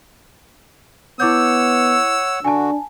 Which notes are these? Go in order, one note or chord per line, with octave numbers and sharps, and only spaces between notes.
B3 E4 C#5 F#5 D6 E6 G6
D3 D4 F#4 G#5 A5